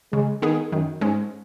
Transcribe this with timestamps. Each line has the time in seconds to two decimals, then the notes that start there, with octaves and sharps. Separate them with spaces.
0.13 C#3 G#3
0.42 D#3 B3 G#4
0.72 F#2 D#3
1.01 G#2 G#3 C#4